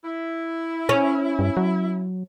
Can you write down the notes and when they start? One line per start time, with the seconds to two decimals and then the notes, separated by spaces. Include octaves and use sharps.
0.04 E4
0.89 C#4
1.39 G2
1.57 F#3